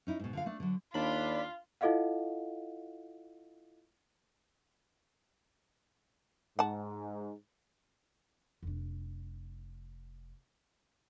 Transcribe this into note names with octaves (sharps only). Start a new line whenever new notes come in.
C#4 D#4 E4
G#2 B2
D3 F4 F5
A3 D4
D3 F#3
D#2 D4 F4 B5
E4 F4 A4 D#5 F5 F#5
G#2 F#5 A5
F1 D4